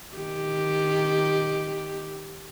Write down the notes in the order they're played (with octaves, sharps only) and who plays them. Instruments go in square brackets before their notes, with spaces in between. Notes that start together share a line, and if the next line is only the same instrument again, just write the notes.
[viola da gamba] D#3 G4